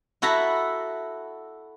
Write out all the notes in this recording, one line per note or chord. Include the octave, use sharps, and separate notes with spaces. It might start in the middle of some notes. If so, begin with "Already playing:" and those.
E4 F#4 A4 A#5 B5